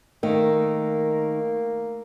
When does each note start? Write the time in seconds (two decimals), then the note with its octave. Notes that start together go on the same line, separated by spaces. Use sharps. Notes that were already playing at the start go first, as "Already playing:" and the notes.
0.23 D#3 A3 A#3